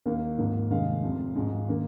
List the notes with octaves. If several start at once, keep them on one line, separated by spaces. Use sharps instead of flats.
D#2 D#3 A#3 F5
G#1 G#2 F3 A#3
F1 D#2 D#3 G#3 F5
F1 F2 C3 F3
G#1 G#2 F3 G#3
D#3 A#3